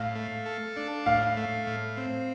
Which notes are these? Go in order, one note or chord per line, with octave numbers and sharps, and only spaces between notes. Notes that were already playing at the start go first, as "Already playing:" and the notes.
Already playing: A2 F5
A3
A4
D4
A2 F5
A3
A2
C4